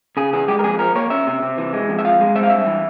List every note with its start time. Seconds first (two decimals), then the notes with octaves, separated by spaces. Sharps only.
0.17 C#3 G#4
0.33 E3 G#4
0.48 G#3 G4
0.59 A#4
0.64 F2 G#4
0.79 F3 A#4
0.95 A#3 C#5
1.10 C#4 E5
1.27 C3
1.42 C3
1.58 E3
1.73 G#3
1.89 F2
1.99 E5
2.05 F3 F5
2.21 G#3
2.36 C4 E5
2.43 F5
2.50 G2 E5
2.67 E3